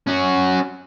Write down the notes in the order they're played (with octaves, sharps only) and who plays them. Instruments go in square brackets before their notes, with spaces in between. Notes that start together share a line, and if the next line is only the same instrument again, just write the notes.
[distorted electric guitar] C#4 F#4